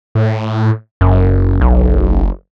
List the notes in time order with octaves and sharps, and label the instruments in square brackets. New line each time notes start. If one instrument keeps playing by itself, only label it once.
[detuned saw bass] A2
[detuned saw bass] F#1 [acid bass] F#2
[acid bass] B1